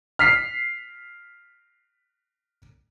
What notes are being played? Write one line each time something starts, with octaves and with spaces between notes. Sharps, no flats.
F6 B6 C7